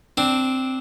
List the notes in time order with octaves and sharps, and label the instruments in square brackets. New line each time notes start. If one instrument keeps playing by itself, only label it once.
[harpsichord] C4 D4